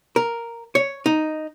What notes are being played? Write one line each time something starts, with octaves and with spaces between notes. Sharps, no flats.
A#4
C#5
D#4